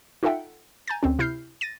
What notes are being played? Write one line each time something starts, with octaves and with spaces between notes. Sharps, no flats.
D#4 F4 A4 E5 F#5 G5
G#5 A#5 G6 A6
D2 C4 C#4
C3 E4 F6 G6 C7
A6 A#6 D#7